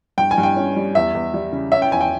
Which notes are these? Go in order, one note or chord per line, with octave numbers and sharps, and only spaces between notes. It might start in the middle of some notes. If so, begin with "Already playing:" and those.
G2 G5
G#5
G2
G5
C#4
G3
E2 E5
E2
G3
C#3
C#4 E5
G5
E2 G#5
G5